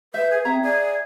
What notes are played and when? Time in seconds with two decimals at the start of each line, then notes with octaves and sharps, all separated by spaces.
0.14 B4 E5 G6
0.31 G#4
0.45 C4 E5 A#5
0.63 G#4 D5